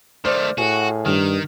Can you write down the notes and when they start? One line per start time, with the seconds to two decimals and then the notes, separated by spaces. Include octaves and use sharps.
0.24 D#3 A3 C5 D5 F6
0.58 A2 F#4 G#4
1.06 G2 D#3 F6